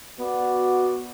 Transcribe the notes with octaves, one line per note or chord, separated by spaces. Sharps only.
B3 F#4 D5